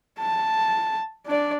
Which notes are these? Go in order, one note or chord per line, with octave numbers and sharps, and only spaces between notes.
A5
D4 D5